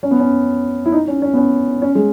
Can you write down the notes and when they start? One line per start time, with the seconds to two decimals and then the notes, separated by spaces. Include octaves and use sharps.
0.03 C#4
0.11 B3
0.20 C#4
0.86 E4
0.92 D#4
1.08 C#4
1.22 C#4
1.33 B3
1.37 C#4
1.82 C#4
1.95 G#3